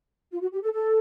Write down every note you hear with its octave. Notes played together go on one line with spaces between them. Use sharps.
F4
F#4
G4
A4
A4